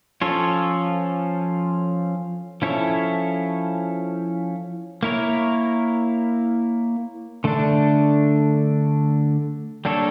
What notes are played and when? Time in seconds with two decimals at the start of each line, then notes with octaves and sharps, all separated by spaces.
0.21 F3 C#4 F4 A4 C#5
2.62 F3 C#4 E4 A4 C#5
5.03 A#3 E4 A#4 C#5
7.44 D3 A3 D4
9.85 G3 A#3 D4 A4 C#5